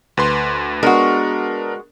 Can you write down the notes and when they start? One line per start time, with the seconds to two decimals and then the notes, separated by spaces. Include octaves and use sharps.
0.17 D2 B4 C6
0.83 G#3 B3 D4 F#4 A#4